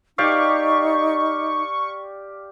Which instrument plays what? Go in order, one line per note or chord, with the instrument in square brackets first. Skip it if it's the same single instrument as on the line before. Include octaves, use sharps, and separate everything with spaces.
[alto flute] D#4 [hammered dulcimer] G4 D5 F5 [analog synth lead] C#6